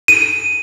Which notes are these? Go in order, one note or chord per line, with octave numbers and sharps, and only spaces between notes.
D#7